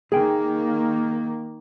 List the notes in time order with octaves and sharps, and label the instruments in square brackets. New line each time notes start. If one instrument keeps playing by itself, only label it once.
[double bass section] D#3 A#3 [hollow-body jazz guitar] G#4 G5